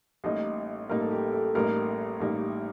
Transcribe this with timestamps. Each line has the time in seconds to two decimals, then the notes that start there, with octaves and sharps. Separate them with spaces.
0.24 A1 A2 G3 A#3 D#4 D#5
0.89 A1 A2 G3 A#3 D#4 A#4
1.00 A4
1.11 G4
1.33 A4
1.55 A1 A2 G3 A#3 D#4 A#4
2.20 A1 A2 G3 A#3 D#4